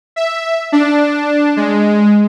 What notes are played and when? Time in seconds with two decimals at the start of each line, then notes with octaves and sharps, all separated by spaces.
0.16 E5
0.72 D4
1.57 G#3